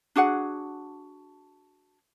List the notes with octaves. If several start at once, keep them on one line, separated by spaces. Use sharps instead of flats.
D4 F#4 G#4 F#5